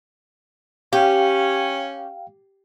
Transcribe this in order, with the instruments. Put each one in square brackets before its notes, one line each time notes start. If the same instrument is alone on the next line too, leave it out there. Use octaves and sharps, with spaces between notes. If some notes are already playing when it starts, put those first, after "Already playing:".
[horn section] C#4 [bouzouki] G4 [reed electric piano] F5 G5